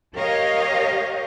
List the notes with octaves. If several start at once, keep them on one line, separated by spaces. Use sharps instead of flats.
G4 A#4 C#5 D#5 F5